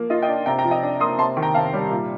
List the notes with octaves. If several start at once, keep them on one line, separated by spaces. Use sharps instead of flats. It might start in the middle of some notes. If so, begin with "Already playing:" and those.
Already playing: F3 A#3
F4 D#5
D#5 G5
D4
C3 G5 A#5
G5 A#5
F3
D#5 G5
D4
A#3 C6 D#6
C3 A5 C6
D#3
G5 A#5
C3 F5 A5
G3
A#2